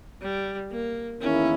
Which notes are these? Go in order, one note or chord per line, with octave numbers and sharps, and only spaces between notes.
G3
A#3
E2 D#3 A#3 C#4 E4